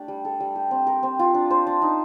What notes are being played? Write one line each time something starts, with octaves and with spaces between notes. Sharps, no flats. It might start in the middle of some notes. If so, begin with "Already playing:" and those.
Already playing: A3 D4 G4 D5
G3
A4
G3
G4
C4
A#4
C4
F4
D4
C5
D4
D#4